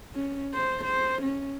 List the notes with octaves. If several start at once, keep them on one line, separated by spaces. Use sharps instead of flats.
C#4
C5
C5
C#4